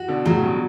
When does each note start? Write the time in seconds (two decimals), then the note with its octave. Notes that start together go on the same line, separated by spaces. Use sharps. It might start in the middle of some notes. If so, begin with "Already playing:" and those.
Already playing: F#4
0.08 B2 D3
0.25 A2 C#3 F#3
0.42 G2 B2